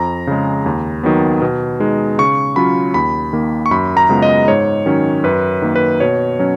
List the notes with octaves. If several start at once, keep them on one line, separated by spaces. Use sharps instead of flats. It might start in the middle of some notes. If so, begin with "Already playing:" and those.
Already playing: F2 A#5
C#3 G#3
D#2
D#3 F#3 B3
B2
G#3 D#4
C#3 C#6
F#3 C#4 F4 B5
D#2 B5
D#3 A#3
C#6
F#2 B5
A#5
C#3 G#3 B3 F4
D#5
G#2 C#5
D#3 F#3 C#4
F#2 B4
D#3 A#3
B4
B2 C#5
F#3 C#4